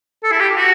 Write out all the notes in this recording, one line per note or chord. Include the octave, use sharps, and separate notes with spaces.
A4
E4
G4
F#4